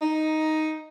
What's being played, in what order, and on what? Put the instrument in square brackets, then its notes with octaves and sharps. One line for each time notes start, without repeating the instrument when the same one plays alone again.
[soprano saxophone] D#4